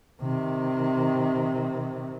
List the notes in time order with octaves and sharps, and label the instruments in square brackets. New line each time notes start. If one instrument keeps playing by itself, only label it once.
[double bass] C3 D#3